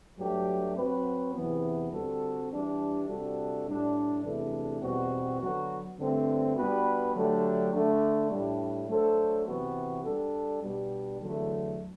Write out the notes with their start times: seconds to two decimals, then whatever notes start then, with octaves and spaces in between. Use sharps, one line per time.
0.18 G2 F#3 A3 D4 G4
0.77 F#3 C4 F#4 B4
1.34 E2 C3 E3 B3
1.92 D3 G3 C4 F#4 A4
2.50 E3 G3 D4 G4
3.09 C3 G3 D4 F#4 A4
3.66 A2 G3 D4
4.24 E2 C3 E3 A3 D4
4.82 E2 B2 G3 C4 F#4
5.41 D3 F#3 B3 F#4
5.98 G2 D3 A3 C4
6.57 G3 B3 D4 F#4 B4
7.14 D3 F#3 A3 D4 G4
7.73 D3 A3 D4
8.31 A2 G3 D4
8.89 F#3 A3 D4 A4 C5
9.46 C3 E3 B3 F#4
10.04 G3 D4 A4
10.63 B2 G3 D4 G4
11.20 E2 D3 F#3 A3